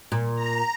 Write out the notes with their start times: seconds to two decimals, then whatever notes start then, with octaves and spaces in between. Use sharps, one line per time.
0.12 A#2
0.35 A#5